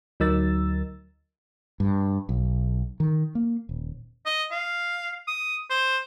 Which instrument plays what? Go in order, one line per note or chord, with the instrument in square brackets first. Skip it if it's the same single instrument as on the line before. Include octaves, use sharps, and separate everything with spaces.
[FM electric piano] D2 F#3 D#4 A#4 E6 A6
[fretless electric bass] G2
B1
D#3
A#3
D#1
[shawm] D#5
F5
D#6
C5